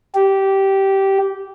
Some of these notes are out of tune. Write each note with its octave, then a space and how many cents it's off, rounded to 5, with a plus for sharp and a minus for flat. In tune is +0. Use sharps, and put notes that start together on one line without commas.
G4 -15